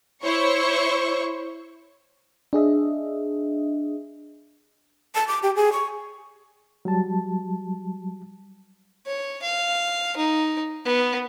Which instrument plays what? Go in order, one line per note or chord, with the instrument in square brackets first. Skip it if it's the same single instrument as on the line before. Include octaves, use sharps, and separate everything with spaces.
[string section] E4 C5 C#5 C#6
[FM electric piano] D4 G#4 D#5 E5
[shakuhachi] A5
D6
G4
G#4
C#6
[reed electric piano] F#3 G3 A5
[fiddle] C#5
F5
D#4
B3